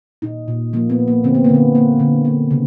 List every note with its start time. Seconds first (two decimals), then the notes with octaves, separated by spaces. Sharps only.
0.22 A#2 D#4
0.48 A#2
0.73 F3 A#3
0.90 B3
0.99 A#2
1.08 A#3
1.24 D3 C4
1.35 B3
1.44 D3 A#3
1.54 B3
1.75 A#3
2.00 D3
2.25 A#3
2.51 C#3